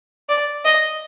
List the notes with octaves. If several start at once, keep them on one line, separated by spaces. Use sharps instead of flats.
D5
D#5